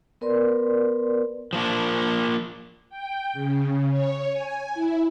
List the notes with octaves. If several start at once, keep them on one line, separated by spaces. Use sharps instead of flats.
B3 A#4 B4 D5 C6
F3 A#3 D4
G5
C#3
C#5
G#5
E4